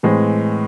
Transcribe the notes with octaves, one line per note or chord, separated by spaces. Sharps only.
A2 E3 G#3 C4